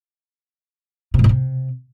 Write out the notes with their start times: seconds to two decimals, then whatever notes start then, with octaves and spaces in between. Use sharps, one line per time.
1.14 C3
1.19 G#2
1.24 B2
1.29 C3